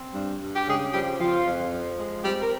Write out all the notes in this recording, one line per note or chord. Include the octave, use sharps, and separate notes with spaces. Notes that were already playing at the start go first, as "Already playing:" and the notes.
Already playing: C4
G2
G2
G4
C#3 G#3 G#4
F3 G3 G4
F2 F3 F4
F2
F3
G#3
G3 C4 G4
A#4